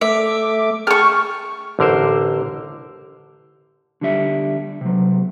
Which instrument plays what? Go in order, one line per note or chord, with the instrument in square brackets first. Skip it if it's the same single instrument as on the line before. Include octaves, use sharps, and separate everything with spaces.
[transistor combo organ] A3 D6 [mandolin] E5
[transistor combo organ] G#4 G5 A5 [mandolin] C#6 F6
[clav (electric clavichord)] A1 D3 A#4 C5
[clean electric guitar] D3 G3 E5
C3 F#3